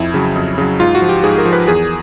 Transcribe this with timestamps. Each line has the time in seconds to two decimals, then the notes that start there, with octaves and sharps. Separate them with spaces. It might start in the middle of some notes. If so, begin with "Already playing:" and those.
Already playing: F2 E4
0.14 C#3 F#3
0.36 F2
0.58 C#3 F#3
0.80 G#2 F4
0.95 F#4
1.02 F3
1.09 G4
1.24 G#2 G#4
1.38 A#4
1.45 F3
1.53 B4
1.67 E2 G#4